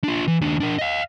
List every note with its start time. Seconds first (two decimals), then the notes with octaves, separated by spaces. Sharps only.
0.04 D4 F4
0.27 E3
0.41 D#2 D4
0.60 D4 A#4
0.78 D#5 F5